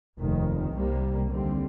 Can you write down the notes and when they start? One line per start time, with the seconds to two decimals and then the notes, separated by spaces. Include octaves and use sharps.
0.18 F1 D#2 D#3
0.73 C2 C3 G3 A#3
1.29 D#2 D3 G3 C4